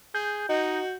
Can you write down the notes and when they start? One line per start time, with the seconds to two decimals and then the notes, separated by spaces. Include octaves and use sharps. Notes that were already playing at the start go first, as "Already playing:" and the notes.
0.15 G#4 G6
0.49 D#4 F#4 D#5